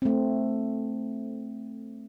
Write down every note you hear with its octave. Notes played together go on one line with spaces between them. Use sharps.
A3 C4